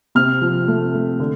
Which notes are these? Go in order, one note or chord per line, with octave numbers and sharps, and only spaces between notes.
C3 F6
F3
A3
A3
D3